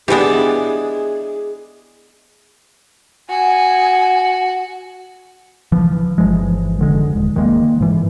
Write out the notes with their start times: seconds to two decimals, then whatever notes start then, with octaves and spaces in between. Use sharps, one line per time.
0.08 E3 G#3 B3 D4 G4 G#4
3.29 F#4 G#5
5.72 E3 F3
6.18 G1 E3 F3 G#3
6.79 F1 D3 G#3
7.13 D#1
7.36 D#3 G#3 A#3
7.80 G#2 E3